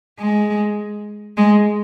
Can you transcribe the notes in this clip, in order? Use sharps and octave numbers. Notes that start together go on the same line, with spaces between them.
G#3
G#3